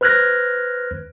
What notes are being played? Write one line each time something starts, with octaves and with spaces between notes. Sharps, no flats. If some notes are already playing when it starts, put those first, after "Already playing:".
B4 C5 F6 F#6 G#6 A#6